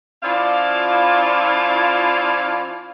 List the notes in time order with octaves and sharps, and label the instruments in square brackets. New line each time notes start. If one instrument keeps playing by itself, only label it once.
[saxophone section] F3 C#4 E4 F4 D5 F5